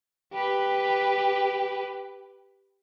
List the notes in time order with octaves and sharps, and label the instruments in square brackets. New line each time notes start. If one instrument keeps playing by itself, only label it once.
[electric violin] G4 B4